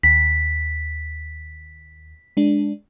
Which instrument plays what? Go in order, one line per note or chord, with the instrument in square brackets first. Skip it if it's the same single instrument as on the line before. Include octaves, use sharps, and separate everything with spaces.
[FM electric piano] D#2 [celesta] B6
[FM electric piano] G#3 D4